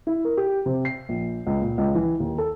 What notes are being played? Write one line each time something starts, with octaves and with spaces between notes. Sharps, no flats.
E4
A#4
G4
C3
C7
A#1
C#2
A#2
C#2
E3
D#2
A4